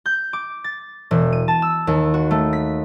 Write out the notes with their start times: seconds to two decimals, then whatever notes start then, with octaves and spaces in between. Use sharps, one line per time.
0.06 G6
0.33 D6
0.64 A6
1.11 E1
1.33 D#7
1.48 A5
1.62 E6
1.87 D#2
2.14 F#4
2.31 A3
2.53 B6